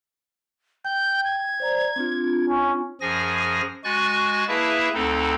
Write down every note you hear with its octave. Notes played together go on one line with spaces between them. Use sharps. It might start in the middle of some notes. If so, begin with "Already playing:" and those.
G5 G6
G#6
C5 D5 A#5
C4 D4 F4
C#4
F#2 F3 G#4 G#5 A#6
G#3 F#4 G#5 C#6 F#6 A6
A#3 E4 G#4 B4 E5 A5
D2 C4 D#4 A4